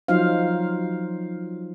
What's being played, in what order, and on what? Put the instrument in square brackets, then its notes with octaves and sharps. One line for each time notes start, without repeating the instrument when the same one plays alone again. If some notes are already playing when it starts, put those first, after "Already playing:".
[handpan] F3 F#3 D#4 F4 C5 F5